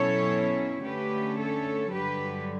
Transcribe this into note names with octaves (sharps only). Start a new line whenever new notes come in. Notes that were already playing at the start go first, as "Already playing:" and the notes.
Already playing: B2 F#3 C#4 E4 A4 C#5
D3 A3 C#4 G4 B4
A4 C#5
G2 D3 F#3 G4 B4